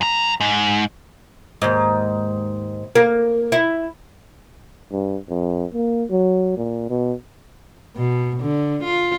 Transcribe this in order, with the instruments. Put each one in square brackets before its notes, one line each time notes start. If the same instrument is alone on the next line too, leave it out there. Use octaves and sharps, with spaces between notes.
[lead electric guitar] F#2 A#5
G#2
[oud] D#2 G#2
A#3
E4
[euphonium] G2
F2
A#3
F#3
A#2
B2
[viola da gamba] B2
D3
F4